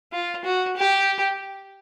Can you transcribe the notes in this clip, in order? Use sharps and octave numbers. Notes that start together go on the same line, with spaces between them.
F4
F#4
G4